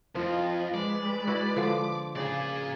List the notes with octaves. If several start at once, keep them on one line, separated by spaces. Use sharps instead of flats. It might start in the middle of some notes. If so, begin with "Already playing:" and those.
F2 F3 F4 D#5
G#3 B4 D5
E4 F#4
D3 F3
C#3 F4 G#4 D5